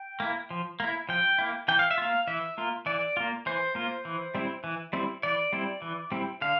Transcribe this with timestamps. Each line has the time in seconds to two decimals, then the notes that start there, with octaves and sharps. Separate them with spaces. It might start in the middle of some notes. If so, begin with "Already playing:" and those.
Already playing: G5
0.20 A#3 E4
0.51 F3
0.80 A#3 E4
1.09 F3 G5
1.39 A#3 E4
1.68 E3 G5
1.79 F5
1.91 E5
1.98 A#3 F4 F5
2.27 E3 E5
2.58 A#3 F4
2.86 E3 D5
3.17 A#3 F4
3.46 E3 C5
3.75 A#3 F4
4.05 E3
4.35 G3 C4 E4
4.64 E3
4.93 G3 C4 E4
5.23 E3 D5
5.53 G3 C4 E4
5.82 E3
6.12 G3 C4 E4
6.42 D3 F5